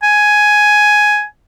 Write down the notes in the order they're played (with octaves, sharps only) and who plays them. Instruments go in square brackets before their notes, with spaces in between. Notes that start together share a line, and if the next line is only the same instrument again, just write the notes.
[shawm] G#5